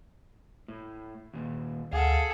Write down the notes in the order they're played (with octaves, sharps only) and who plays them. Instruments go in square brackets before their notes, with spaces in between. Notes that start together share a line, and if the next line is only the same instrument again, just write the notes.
[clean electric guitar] A2
D#2 A#2
[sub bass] D2 [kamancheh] G#4 A4 [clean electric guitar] F5 F#5